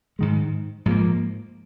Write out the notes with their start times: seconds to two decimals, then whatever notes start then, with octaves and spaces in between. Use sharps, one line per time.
0.19 G#2 D#3 G#3
0.86 G#2 F3 A#3